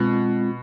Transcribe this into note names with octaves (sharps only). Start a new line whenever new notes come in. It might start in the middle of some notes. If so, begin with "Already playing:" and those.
Already playing: B2 G#3 C4 F4